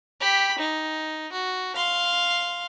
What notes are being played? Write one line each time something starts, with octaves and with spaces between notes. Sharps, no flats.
G4 B5
D#4
F#4
F5 C6